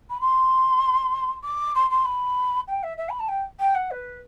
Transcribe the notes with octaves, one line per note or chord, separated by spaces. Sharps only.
B5
C6
D6
C6
C6
B5
G5
E5
E5
B5
A5
G5
G5
F#5
B4